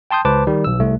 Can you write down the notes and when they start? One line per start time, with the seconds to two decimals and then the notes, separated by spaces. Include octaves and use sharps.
0.11 G5 A5 C6 D#6 G6
0.25 C#2 B4 C5 A5 D6
0.47 D#3 G3
0.64 B1 E6
0.80 C2 A3